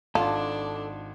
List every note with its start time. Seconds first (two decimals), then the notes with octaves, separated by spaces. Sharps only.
0.15 G#1 D4 F4 A4 C6